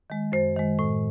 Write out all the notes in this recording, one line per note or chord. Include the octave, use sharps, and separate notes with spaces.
D#3 G#3
F#2 C5
D#3 G#3
A2